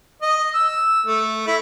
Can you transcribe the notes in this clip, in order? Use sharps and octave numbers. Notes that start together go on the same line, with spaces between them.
D#5
E6
A3
E4